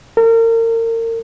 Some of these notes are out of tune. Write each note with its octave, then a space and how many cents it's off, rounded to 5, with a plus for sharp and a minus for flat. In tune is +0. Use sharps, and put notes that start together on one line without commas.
A#4 -35